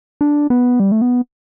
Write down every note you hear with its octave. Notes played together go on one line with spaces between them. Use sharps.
D4
B3
G3
A3
B3